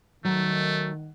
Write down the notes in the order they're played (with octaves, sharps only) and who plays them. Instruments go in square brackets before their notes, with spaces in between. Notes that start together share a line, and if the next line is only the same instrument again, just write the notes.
[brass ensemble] D#3 [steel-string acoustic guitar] F#3 [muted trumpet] A3